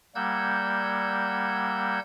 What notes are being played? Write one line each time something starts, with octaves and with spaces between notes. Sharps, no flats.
G3 A#3 F#5 E6 G6 G#6